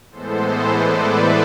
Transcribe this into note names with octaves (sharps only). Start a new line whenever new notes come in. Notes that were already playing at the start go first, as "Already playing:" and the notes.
A2 E3 G#3 B3 A4 C5
B4 D5
C5 E5